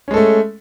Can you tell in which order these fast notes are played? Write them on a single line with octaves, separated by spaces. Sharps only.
C#4 G#3 A4 A3